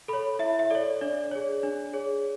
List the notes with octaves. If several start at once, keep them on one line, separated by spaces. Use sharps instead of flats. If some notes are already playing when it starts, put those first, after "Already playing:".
A4 C#5 B5
E4 E5
E5
A4 C#5 D5
D4 D5
G#4 C#5
D4
G#4 C#5